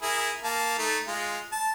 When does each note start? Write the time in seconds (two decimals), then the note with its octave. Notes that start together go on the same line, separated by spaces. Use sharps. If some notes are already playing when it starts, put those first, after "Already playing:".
0.02 E4 G#4 A#4
0.44 A#3 A5
0.78 A3 D#4
1.07 G#3 F4
1.52 A5